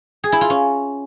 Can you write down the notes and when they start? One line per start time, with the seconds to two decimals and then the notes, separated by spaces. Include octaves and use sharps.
0.24 G#4
0.32 E4
0.41 F4
0.50 C#4